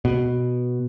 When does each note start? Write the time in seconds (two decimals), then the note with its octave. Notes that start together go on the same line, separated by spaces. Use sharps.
0.05 B2